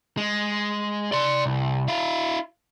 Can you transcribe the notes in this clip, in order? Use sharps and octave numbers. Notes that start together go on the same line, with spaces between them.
G#3
D5 C6
C2
E4 F5